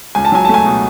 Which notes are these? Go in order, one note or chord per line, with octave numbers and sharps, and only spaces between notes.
C#2 G#5
A5
F#3 G#5
A3 A5
G#5
B2